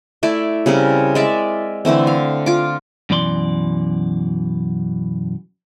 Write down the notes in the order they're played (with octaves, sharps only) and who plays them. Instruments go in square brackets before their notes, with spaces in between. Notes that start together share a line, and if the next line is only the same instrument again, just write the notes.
[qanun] A3 E4 D5 E5
C#3 G3 C4 A#4
G#3 D5 E5
D3 E3 A3 C4
F5
F4 D6
[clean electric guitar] F#2 B2 E3 D5 C6